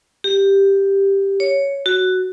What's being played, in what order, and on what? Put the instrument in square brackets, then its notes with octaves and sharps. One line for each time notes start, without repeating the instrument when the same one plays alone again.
[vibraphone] G4
C#5
F#4